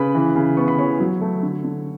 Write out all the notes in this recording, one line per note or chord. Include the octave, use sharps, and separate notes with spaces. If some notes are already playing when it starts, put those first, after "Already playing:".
Already playing: C#3 B4 B5
E3
C#3
B3 C#6
B5
E3 C#5 C#6
F#3
A3
D3
D3